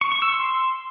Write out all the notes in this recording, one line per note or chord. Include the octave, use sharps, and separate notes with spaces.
C#6
C#6
E6
C6